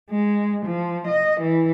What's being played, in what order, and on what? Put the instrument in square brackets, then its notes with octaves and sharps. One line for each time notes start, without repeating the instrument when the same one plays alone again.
[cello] G#3
F3
D#5
E3